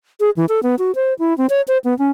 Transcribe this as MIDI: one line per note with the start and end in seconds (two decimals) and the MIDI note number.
0.20 0.30 68
0.37 0.46 52
0.49 0.60 69
0.63 0.75 59
0.79 0.92 66
0.95 1.14 72
1.19 1.36 64
1.38 1.46 60
1.50 1.61 73
1.68 1.78 72
1.84 1.97 59
1.99 2.11 61